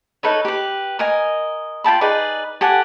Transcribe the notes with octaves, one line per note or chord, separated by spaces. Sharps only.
D#4 A4 B4 C#5
G4 B4
A#4 D#5 G#5
F4 G5 A5 B5
D#4 G#4 B4 D5
G4 A4 F#5 G#5